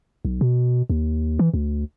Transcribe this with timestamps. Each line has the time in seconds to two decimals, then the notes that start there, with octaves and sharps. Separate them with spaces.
0.25 B1
0.41 B2
0.90 D#2
1.39 E3
1.54 D2